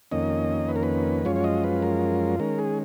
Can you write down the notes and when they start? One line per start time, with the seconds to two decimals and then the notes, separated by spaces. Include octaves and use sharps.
0.11 F2 D#3 A#3 C#4 D#5
0.69 B4
0.76 A#4
0.83 B4
1.25 F#2 F3 G#3 C#4 F4 C#5
1.36 C#5
1.44 D#5
1.64 B4
1.82 A#4
2.40 D#3 G#3 C#4 A#4
2.59 G#4